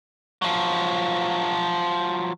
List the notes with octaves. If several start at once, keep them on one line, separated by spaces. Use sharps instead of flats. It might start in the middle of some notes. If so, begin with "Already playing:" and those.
F3 F#3